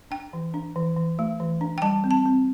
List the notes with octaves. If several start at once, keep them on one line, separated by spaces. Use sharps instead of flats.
D4 G5
E3
D4
E3
E3
A3
E3
D4
G5
G3 A5
C4
A5
C4